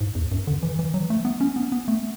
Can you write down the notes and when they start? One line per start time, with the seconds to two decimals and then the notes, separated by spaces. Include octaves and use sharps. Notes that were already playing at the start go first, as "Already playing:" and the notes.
0.01 G#2
0.15 E2
0.32 F#2
0.47 D3
0.63 E3
0.79 E3
0.94 F#3
1.10 A3
1.25 B3
1.41 C#4
1.56 B3
1.72 B3
1.88 A3